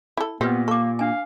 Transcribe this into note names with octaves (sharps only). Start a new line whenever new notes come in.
E4 A4
A#2 B3 C4 G4 B4
A#3 A4 C#6 D6
D4 F5 G#5